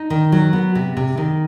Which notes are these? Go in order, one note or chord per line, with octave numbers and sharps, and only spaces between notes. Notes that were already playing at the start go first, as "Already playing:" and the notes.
Already playing: D#4
D#3
F#3
B3
C3
C3
D#3